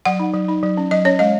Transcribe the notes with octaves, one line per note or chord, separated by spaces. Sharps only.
F#3 F#5
D#4
F#3
D#4
F#3
C#4
F#3 D#5
C#4 C#5
G#3 D#5